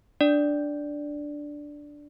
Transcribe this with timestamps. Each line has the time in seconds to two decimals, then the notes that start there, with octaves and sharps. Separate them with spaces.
0.21 D4 D5